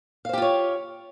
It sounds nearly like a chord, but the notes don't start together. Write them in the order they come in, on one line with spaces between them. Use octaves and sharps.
F5 C5 G4 F4 C#5